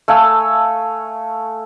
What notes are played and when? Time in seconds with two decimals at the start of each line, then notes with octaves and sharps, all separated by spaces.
0.08 A3 F5 G#5 E6